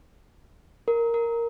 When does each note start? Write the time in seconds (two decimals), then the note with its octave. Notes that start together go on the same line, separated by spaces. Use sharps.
0.88 A#4
1.14 A#4